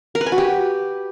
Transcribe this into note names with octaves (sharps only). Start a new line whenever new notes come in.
A#4
B4
G#5
F#4
G4